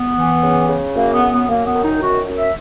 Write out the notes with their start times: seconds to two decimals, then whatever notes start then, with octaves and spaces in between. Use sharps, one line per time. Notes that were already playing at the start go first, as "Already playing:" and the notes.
Already playing: B3
0.16 E3
0.42 C#3
0.69 C#3
0.95 F#2 A#3
1.13 B3
1.22 F#2
1.31 B3
1.48 F#2 A#3
1.66 B3
1.75 D#3
1.84 D#4
2.01 F#2 F#4
2.28 F#2
2.37 E5